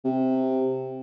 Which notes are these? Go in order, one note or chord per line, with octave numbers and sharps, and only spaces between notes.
C3